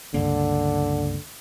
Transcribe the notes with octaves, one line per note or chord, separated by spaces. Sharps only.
C#2 G2 D3 A#3